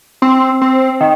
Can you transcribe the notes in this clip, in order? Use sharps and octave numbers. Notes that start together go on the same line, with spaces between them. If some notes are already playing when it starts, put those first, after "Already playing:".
C4
C4
D#3